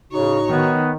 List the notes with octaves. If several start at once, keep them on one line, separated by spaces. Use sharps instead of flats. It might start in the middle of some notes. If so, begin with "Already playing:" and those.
A2 C#3 D#4 F#4 C#5
D#3 B3